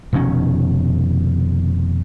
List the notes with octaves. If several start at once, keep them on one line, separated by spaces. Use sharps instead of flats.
F1 B2 D#3 C#4